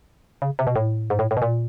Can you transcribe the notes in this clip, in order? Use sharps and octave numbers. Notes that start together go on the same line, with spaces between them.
C#3
C3
B2
A2
G#2
A2
A2
B2
A#2